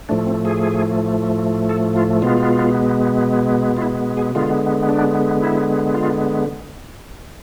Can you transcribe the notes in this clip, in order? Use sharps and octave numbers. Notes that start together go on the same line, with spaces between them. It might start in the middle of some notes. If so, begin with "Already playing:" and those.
A2 F3 A3 D4
C4
G#4
A4
F4
B2 G#3 B3 F4
F4
E4
G#4
D3 G#3 B3 F4
D4
E4
F4